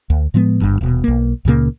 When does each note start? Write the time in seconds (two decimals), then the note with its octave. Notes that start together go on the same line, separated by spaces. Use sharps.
0.10 D2
0.34 A2 F3 G#3 B3
0.61 G1 G2
0.81 D#1 B2
1.04 B1 A#3
1.45 C#2 A#2 C#3 A#3